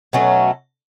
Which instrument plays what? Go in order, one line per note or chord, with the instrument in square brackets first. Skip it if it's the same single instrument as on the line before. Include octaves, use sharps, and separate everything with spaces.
[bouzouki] B2 F#3 A3 C#4